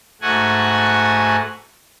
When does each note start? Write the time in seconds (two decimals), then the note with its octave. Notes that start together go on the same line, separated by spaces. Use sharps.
0.21 G#2 A3 F#4 F#5 G#5